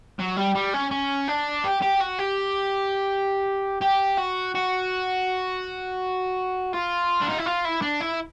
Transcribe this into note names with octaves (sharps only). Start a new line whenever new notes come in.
F#3
G3
G3
C#4
C#4
D4
G4
G4
F#4
G4
G4
F#4
F#4
F4
D4
D#4
E4
F4
E4
D4
E4